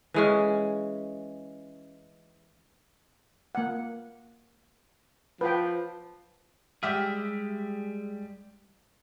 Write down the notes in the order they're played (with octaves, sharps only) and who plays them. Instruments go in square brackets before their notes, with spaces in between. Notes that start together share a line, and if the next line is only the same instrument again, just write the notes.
[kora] E3 G#3 C#4
[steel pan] A#3 F#5
[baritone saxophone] F3 [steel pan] B4 G5
[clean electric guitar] G3 G#3 G#4 [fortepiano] G4 E5 F6